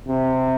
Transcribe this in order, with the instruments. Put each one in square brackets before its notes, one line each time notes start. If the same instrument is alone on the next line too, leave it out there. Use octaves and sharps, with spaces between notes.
[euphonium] C3